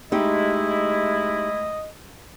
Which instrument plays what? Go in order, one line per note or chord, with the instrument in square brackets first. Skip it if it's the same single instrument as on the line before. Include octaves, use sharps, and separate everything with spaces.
[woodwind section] G#3 A3 E4 [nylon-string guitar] D#4 G4 [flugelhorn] D#5